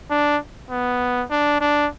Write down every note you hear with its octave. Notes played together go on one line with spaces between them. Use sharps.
D4
B3
D4
D4